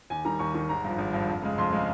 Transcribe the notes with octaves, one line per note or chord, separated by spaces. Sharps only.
D#2 G#5
D#3 G3 A#5
D#2 C#6
D#3 G3 C#6
G#1 A#5
G2 F3
G#1
G2 F3
F2
C#3 G#3
F2 C6
C#3 G#3